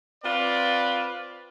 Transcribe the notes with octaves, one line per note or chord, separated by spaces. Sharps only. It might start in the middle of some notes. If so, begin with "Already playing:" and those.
C4 F4 B4 D5